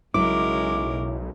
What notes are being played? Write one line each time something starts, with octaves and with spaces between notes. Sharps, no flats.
B1 C#3 F#3 G#3 E4 A#4 D6